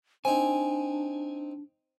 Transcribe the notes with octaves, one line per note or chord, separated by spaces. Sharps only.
C4 D4 D#4 G#5